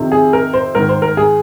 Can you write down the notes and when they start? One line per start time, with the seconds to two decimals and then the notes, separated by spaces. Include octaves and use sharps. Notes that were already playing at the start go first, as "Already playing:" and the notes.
Already playing: F2 C3 D#3
0.12 G#4
0.33 A#4
0.53 C5
0.75 G#2 D#3 A#4
0.89 C5
1.02 A#4
1.17 G#4